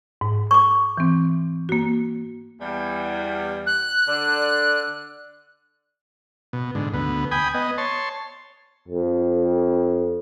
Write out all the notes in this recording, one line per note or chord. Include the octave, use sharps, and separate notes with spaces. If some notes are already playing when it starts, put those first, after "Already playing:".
G#2
C#6 D6
E3 C4
A#3 F#4
E2 G3
F#6
D3 D5
B2
G#2 D3
D2 B3
G5 G#5 B5 D#6
B3 D#5
C#5 A5 C6
F2